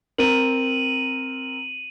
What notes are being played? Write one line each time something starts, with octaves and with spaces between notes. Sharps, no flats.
C4 A#4 D#7 F#7